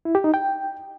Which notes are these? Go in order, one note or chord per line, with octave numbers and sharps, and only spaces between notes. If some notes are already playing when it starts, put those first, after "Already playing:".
E4
G4
D#4
G5